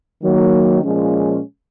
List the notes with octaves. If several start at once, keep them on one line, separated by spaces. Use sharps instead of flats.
D#3 F#3 A#3
A#2 F3 G#3 C#4